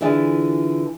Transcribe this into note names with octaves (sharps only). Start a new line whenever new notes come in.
D3 E3 E4 F4 G#4